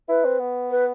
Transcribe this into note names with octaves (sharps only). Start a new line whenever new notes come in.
E4 B4
C4
B3
B4